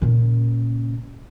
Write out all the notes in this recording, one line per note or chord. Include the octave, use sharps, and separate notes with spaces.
A#2 C#3